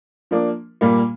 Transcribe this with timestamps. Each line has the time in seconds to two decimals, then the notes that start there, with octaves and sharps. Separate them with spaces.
0.31 F3 A#3 D4
0.81 A#2 G3 A#3